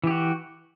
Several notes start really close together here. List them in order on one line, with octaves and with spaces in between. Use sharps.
E3 G4 F#4